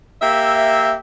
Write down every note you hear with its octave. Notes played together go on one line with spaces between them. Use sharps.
A#3 G4 E5